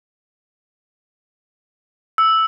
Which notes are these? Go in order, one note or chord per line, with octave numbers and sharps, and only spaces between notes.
E6